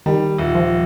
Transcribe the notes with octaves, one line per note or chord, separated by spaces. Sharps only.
D#3 G3
D#1
F3